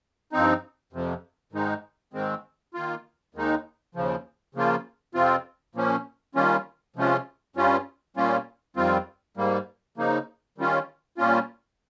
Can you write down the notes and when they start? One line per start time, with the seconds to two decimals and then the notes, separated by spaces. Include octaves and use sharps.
0.33 G2 F3 C4 D#4
0.93 F2 C3 F3
1.53 G#2 D#3 G#3 D#4
2.13 G#2 D#3 G#3 C4
2.74 D#3 A#3 F4
3.35 D#2 D#3 G#3 D#4
3.95 D#2 C#3 F3
4.55 C#3 F3 A#3 F4
5.14 F2 C3 F3 C4 F4
5.75 A#2 F3 A#3 C#4
6.35 D#3 G3 A#3 C#4 F4
6.96 C3 F3 G#3 C#4 F4
7.56 G2 G3 C#4 F4
8.17 A#2 G3 A#3 C#4 F4
8.76 F2 D#3 G3 C4 F4
9.37 G#2 G3 A#3
9.97 C#3 F3 A#3 D#4
10.58 D#3 G3 C#4 F4
11.18 A#2 G3 A#3 C#4 F4